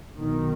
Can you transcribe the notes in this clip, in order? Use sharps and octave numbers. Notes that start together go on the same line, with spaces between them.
B1 B2 D#3